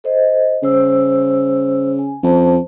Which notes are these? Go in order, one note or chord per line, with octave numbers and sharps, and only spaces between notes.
A4 C5 D#5
C#3 G3 C5 E6
G#5
F2 C#4 C5 A5